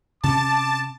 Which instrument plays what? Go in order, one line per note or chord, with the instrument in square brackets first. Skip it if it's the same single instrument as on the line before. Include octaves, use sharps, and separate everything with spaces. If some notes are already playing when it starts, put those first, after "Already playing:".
[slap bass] C3 C#4 [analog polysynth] A5 [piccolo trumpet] D6